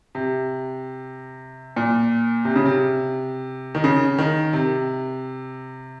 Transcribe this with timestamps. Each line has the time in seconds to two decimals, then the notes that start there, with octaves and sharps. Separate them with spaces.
0.15 C3
1.76 A#2
2.45 C3
2.56 C#3
2.66 C3
3.75 D#3
3.84 C#3
4.18 D#3
4.53 C3